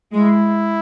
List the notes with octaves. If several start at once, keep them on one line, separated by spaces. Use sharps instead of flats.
G#3 E4